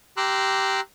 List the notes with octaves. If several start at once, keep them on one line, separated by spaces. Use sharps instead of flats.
G4 A#5 C6 D6 E6 F#6